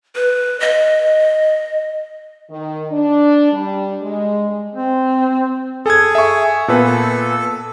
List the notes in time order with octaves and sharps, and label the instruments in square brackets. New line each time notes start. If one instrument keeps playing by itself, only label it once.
[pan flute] B4
D#5
[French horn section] D#3
D4
G3
G#3
[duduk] C4
[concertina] G#4 [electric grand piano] A4 G#6
[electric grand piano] E5 C#6
[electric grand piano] A#2 B3 B4 [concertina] A4